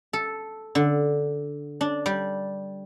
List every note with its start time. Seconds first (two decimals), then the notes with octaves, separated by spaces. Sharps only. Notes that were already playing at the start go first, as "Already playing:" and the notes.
0.13 A4
0.75 D3
1.81 D4
2.06 G3